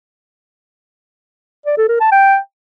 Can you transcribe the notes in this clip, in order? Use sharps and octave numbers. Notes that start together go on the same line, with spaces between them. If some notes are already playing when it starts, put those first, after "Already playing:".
D5
A4
A#4
A5
G5